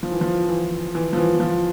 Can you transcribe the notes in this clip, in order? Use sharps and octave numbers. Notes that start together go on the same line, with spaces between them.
F3
E3
F3
E3
E3
F3
E3
E3
F3